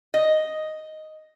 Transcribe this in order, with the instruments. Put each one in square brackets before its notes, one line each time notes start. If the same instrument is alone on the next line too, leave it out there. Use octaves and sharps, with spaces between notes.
[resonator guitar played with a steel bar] D#5